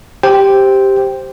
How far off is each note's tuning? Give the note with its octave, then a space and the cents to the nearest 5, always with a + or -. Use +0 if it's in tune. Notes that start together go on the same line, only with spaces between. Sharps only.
G4 +0 C5 +0 G5 +0